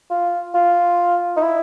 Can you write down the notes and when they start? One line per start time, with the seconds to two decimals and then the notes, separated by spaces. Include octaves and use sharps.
0.10 F4
0.55 F4
1.37 D#4
1.43 E4